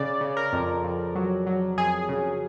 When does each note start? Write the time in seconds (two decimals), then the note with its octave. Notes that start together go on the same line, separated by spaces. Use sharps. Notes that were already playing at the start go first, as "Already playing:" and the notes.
Already playing: C#3 D5
0.21 C#3
0.37 A#4
0.53 F2
0.84 F2
1.15 F#3
1.47 F#3
1.77 F2 G#4
2.09 C#3